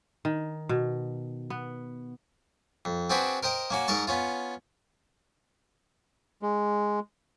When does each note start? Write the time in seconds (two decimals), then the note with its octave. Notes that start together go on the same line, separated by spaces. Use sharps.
0.25 D#3
0.69 B2
1.50 B3
2.85 F2
3.10 C4 D4 F#4 G#4 B4 C5
3.43 A#4 C5 D#5 G5
3.70 A#3 C#4 F#4
3.88 G#2 A#4 D#5 A5 C#6
4.07 B3 C#4 F4
6.42 G#3